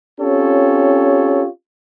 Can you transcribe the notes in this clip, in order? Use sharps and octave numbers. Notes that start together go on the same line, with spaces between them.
C4 C#4 F4 G4 A4 C#5